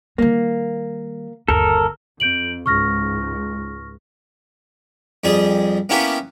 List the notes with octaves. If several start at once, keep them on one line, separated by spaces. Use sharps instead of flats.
D#3 G3 A#3
G1 D#2 A4 A#4
F2 G6 D7 F#7
C#2 G#2 C#6 F6 A#6
F2 G3 G#4 D#6
A#3 B3 C#4 E4 G4 B4